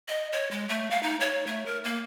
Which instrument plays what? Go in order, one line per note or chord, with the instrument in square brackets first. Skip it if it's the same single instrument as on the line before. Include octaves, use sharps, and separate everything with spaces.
[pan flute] D#5
C#5
G#3
A3
F5
D#4
C#5
A3
A#4
A#3